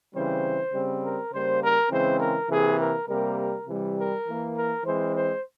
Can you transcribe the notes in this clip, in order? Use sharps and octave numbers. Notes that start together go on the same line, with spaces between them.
C#3 E3 G3 C4 C5
C#3 G3 C4
A#4
C#3 G3 A#3 C5
A#4
C#3 E3 G#3 C4 C5
A#4
C3 E3 A#3 G#4
A#4
C3 G3 A#3 A#4
A#4
C3 E3 G3
A#4
E3 A#3
A#4
E3 G#3 C4 C5
C5